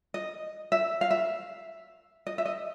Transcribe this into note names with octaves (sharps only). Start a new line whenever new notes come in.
D#5
E5
F5
E5
D#5
E5
D#5